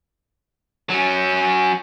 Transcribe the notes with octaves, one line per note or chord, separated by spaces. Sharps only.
F#3 C#4